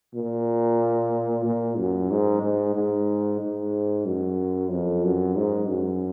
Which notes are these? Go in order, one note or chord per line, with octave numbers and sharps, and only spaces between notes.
A#2
A#2
F#2
G#2
G#2
G#2
G#2
F#2
F2
F#2
G#2
F#2